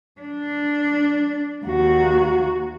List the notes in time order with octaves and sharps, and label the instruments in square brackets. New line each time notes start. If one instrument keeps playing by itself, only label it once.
[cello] D4
D#2 F#4